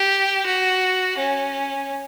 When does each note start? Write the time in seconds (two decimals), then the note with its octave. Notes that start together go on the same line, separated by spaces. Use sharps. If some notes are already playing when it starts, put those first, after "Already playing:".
Already playing: G4
0.46 F#4
1.17 C#4